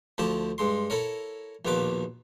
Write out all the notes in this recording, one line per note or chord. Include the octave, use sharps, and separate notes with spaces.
D2 F3 E4 G4 A5
G2 G#3 C6
E4 A4 A#4 C#5
A#1 D#2 B2 F4 B4 D6